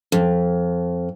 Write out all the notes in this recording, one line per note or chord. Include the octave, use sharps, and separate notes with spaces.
F2